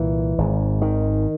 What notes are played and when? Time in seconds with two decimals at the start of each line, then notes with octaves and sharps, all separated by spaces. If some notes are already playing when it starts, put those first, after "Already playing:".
Already playing: C2 A#2 E3
0.38 G#1 G#2
0.82 D#3